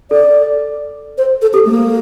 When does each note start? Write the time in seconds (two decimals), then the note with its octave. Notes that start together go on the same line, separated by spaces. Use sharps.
0.11 A4 D5
1.18 C5
1.42 A4
1.54 G4 A4
1.66 A3
1.71 A#3